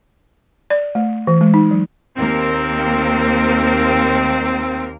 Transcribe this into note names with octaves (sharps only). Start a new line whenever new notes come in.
D5
A3
E3
G#3
D#4
F#3
D#2 A#3 C4 A#4